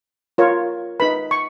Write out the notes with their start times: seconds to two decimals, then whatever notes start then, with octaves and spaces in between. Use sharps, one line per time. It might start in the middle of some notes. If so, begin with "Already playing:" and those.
0.38 F4 A#4 C#5
1.00 D#4 G#4 B4 B5
1.31 C#6